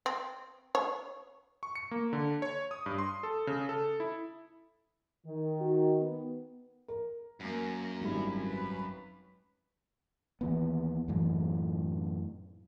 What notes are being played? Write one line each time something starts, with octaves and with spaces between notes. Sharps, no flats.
C4
C#5
C#6
C#7
A#3
D3
C#5
D#6
G2
C6
A4
C#3
A4
E4
D#3
F#4
B3
A#4
F#2 A#3
G#1 G3 C4 E4
B4
D#2 E3 B3
F#2 A2 E3